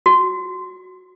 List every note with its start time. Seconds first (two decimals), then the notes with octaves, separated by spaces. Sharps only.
0.06 F#4